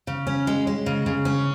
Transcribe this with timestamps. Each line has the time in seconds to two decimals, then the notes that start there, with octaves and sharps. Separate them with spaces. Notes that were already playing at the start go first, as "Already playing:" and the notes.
0.07 C#3
0.27 C#4
0.47 G#3
0.67 G#3
0.86 C#3
1.06 C#3
1.25 C#4